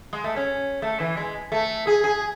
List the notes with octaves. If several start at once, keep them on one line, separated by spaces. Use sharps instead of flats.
G#3
A3
C#4
A3
E3
G#3
A3
G#4
G#4